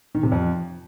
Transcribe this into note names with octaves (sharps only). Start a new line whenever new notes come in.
D#3
C3
F2